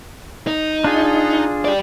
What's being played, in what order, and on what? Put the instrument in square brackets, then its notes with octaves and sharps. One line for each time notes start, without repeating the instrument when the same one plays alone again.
[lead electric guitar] D#4
[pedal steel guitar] D4 F4 G#4
[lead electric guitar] G4 D5